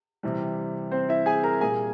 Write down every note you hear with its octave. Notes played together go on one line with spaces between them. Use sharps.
C3 E3 G3
C4 C5
E4 E5
G#4 G#5
A#4 A#5
A#2 G3 A#3 G#4 G#5